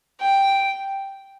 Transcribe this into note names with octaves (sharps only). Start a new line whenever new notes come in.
G5